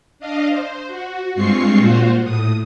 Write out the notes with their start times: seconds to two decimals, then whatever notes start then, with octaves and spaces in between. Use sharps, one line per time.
0.19 D4 D#5 F5
0.49 C5
0.87 F#4
1.34 G2 G#3 C4 F4 C#6 C7
1.78 A#2 F4 F#4 C5
2.23 A2 D#6